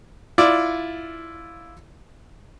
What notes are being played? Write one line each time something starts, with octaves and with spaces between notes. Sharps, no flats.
E4 F4 D5